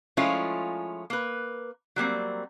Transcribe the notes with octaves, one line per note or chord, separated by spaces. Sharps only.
F3 G#3 A3 C#4 E4 F4
A#3 B4
F#3 G3 A#3 C4